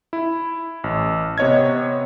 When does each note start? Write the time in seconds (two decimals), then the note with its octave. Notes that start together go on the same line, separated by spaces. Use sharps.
0.13 E4
0.84 A1
1.38 C3 B3 C#5 D#5 G#6